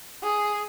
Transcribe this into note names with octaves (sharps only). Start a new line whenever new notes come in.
G#4